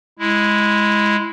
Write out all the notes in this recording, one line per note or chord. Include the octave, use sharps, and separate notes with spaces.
G#3 E4